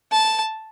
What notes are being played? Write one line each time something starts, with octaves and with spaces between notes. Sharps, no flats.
A5